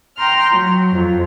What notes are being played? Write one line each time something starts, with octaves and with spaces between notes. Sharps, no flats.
G5 A#5 C6 F6
F#3
F2